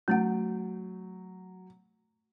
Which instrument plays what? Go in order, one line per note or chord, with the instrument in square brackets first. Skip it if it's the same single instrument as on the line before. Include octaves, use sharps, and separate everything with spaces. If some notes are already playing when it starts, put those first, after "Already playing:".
[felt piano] F#3 [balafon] A3 C#4 F#5